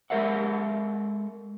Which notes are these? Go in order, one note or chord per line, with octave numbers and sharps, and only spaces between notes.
G#3 A4 A#4 E5 F#5